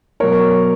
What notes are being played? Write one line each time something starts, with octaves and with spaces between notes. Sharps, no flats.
B2 F#3 A#4 C#5